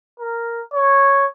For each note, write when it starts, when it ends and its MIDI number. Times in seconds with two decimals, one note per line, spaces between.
0.20 0.61 70
0.74 1.26 73